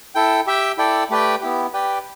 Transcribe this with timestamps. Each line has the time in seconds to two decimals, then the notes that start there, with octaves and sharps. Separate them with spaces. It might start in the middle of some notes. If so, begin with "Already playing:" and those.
0.15 E4 A4 G5
0.47 G4 E5 G5
0.78 E4 A4 D5 G5
1.10 A3 G4 B4 D5 G5
1.41 B3 E4 G4
1.73 G4 B4 D5 G5